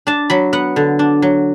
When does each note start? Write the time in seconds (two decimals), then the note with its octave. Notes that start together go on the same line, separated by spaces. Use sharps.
0.07 D4 A5
0.30 F#3 B5
0.53 B3 F#5
0.76 D3
0.99 D4
1.22 F#3